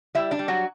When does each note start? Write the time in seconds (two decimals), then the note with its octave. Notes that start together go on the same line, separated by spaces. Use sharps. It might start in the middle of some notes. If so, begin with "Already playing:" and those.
0.15 G3 E4 E5
0.31 D4 D5
0.39 G3
0.48 F#3 F#4